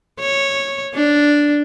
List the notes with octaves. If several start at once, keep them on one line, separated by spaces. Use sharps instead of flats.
C#5
D4